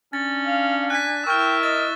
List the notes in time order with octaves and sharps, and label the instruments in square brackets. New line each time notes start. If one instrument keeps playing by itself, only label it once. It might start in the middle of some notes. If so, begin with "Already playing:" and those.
[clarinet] C#4 [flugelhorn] D4 [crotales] A6
[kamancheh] F5
[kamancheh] G#5 [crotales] F#6 B6
[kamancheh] E4 E6 [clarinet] A#4 [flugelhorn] G5 [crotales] C#6 F6
[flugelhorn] D#5 [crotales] A6